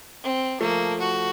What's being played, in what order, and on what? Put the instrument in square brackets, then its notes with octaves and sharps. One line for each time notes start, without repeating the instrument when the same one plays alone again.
[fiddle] C4
[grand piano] F3 A3 [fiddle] A#3
[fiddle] F#4